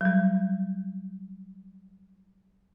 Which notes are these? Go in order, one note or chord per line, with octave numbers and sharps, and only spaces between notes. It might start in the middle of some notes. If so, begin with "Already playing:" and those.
F#3 G3